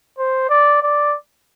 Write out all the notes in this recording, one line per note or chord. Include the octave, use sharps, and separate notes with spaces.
C5
D5
D5